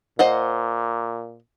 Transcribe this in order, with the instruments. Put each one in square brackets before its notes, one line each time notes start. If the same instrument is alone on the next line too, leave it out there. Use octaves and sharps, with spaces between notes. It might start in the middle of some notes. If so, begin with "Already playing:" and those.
[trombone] A#2 [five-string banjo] C5 D#5 F#5